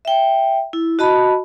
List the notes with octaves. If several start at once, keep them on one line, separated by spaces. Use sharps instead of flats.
E5 G5
E4
F#4 D#5 A5 B5